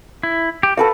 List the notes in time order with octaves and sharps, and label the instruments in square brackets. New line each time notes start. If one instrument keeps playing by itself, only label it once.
[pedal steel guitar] E4
G4
[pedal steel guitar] F#4 [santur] A4 B4 F5